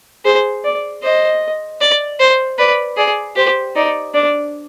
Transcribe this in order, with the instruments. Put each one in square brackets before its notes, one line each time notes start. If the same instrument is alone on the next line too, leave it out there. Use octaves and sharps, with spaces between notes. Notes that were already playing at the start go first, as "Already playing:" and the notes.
[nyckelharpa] G#4 [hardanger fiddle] C5
[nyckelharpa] D5
[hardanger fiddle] C5 [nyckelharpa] D#5
[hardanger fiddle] D5
C5
[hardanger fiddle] B4 [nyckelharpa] D5
[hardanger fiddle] G#4 [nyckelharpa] D5
[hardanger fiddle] G4 [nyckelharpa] C5
[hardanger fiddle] D#4 [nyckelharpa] D5
[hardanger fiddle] D4 [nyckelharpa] D5